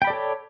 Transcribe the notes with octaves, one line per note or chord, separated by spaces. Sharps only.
A4 C#5 D5 G5 B5